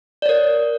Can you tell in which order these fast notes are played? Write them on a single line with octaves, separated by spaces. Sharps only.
D5 C#5 A#4